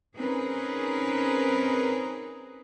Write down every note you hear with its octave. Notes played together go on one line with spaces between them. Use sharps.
C4 C#4 D#4 G#4 A#4 B4